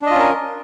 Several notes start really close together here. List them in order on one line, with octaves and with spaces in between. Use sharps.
D4 D#5 F4 C#4 A#4